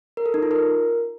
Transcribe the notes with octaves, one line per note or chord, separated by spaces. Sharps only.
A#4
A4
D#4
F4
A#4